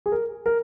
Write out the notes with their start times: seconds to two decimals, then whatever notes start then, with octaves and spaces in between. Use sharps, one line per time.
0.06 G#4
0.12 A#4
0.46 A#4